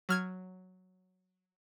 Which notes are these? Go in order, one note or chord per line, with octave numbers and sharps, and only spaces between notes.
F#3 F6 G#6